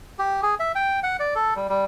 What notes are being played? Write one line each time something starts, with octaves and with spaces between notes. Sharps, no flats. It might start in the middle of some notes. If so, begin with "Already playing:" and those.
G4
G#4
E5
G5
F#5
D5
A4
G3
G3